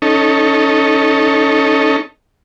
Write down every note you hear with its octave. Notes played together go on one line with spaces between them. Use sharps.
C#4 D#4 A4